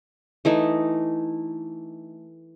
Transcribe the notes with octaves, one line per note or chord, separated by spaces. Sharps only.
E3 A3 D#4